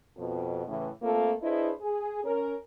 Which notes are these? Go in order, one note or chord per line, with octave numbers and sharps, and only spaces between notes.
F2 B2
A2 C#3 E3
A3 A#3 C4 F4 A4
D4 E4 G#4 B4 C5 D#5
G#4
C#4 A#4